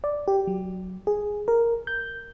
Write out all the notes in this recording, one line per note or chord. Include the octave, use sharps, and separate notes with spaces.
D5
G4
F#3
G#4
A#4
G6